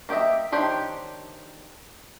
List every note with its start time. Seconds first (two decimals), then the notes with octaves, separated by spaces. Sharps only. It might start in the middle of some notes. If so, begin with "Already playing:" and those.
0.09 A#3 G4 C#5 D#5 E5
0.52 D#3 D4 G4 C5 C#5